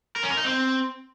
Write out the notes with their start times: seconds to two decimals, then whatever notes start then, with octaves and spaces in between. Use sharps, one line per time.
0.16 A#4
0.23 C#4
0.30 A#4
0.37 D#4
0.44 C4